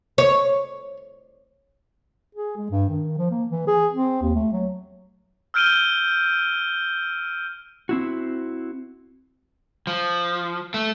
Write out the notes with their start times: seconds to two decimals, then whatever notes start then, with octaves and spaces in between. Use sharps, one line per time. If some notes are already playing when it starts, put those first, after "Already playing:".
0.18 C#5
2.35 G#4
2.57 G#3
2.71 G2
2.89 D#3
3.18 F3
3.31 A#3
3.50 E3
3.67 G#4
3.93 C4
4.22 D#2
4.35 A3
4.53 F#3
5.54 E6 F6 G6 D7 D#7 G7
7.89 C4 E4 F#4
9.87 F3
10.74 A3